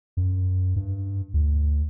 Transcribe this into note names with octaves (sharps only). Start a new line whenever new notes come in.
F#2
G2
D2